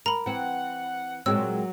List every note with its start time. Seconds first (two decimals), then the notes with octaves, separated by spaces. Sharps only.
0.06 A#4 A#5 B5
0.26 E3 C4 F#5
1.26 A#2 F#3 G#3 C4 E6